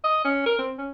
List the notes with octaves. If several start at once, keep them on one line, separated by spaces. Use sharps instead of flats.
D#5
C#4
A#4
C4
C#4